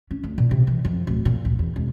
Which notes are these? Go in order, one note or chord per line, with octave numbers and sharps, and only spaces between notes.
C#4
D2
A#2
C3
E3
F2
D1
A#2
D2
E2
E1